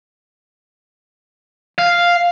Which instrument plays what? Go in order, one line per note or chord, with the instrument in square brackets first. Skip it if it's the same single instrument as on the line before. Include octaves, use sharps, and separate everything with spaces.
[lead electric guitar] F5